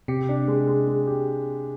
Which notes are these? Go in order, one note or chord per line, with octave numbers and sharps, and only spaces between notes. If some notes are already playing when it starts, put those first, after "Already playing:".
C3 G4
D4
G#3
G#3
G#3
G4